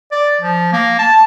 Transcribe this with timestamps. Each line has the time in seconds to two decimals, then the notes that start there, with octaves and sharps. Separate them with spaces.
0.12 D5
0.41 F3
0.73 A#3
0.99 A5